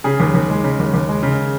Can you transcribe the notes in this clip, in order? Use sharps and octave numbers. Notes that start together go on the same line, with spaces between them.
C#3 G#4
D#2
D#2
G#3
C#3
D#2
D#2
G#3
C#3